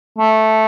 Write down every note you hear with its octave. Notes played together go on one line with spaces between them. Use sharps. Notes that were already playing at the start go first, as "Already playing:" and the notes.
A3